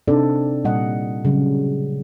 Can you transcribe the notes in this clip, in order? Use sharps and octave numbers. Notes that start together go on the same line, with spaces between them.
C3 C4 D4 D#4 A4 D5
A#2 G3 D#5 F#5
C#3 F#3 G3